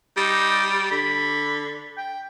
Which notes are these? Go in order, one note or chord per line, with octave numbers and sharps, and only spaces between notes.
G3 D#4
D3 B5
G5